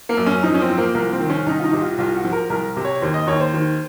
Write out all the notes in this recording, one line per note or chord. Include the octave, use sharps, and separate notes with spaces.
A#3
F#2
C#4
F3 D#4
C#4
C4
F3
A#3
C2 A#3
C4
D#3
C#4
C2 D#4
F4
D#4
C3
F4
C2 F4
F#4
F3
A#4
C2 A#4
C3
C#5
D#2 C5
D#5
D#2 C#5
C5
D#3